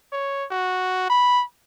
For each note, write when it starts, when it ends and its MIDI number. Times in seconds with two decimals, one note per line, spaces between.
0.12 0.45 73
0.51 1.09 66
1.10 1.43 83